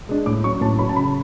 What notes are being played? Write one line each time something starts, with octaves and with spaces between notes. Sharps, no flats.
G#3 D4
A2 D6
F#3 C#4 C#6
A2 A5
F#3 C#4 B5
A5
C#3 B5